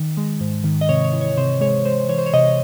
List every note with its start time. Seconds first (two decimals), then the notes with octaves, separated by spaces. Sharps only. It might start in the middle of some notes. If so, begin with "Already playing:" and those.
Already playing: D#3
0.17 G#3
0.41 G#2
0.64 D#3
0.81 D#5
0.89 C3 C#5
1.04 C#5
1.13 E3
1.21 C#5
1.37 C3 C5
1.61 G#3 C#5
1.85 G#3 C5
2.09 E3 C#5
2.18 C5
2.26 C#5
2.34 C3 D#5